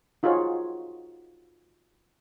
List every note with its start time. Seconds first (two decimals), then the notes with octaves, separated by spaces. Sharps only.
0.23 D#4 F4 F#4 G#4 C5 C#5